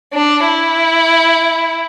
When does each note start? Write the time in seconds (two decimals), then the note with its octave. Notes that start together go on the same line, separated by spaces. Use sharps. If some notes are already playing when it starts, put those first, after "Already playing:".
0.14 D4
0.46 E4